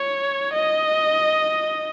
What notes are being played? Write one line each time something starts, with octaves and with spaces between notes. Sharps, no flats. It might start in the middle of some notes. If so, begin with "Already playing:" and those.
Already playing: C#5
D#5